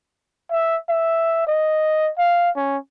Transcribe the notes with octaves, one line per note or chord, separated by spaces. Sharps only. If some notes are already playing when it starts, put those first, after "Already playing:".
E5
E5
D#5
F5
C#4